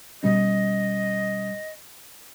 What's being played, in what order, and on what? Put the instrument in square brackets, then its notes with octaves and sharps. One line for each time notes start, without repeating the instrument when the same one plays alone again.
[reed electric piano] B2 G3 C#4 [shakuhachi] D#5